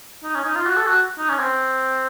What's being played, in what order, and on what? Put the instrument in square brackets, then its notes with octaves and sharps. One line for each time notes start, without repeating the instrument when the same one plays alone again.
[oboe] D#4
C#4
D#4
F4
F#4
A4
F#4
D#4
C#4
C4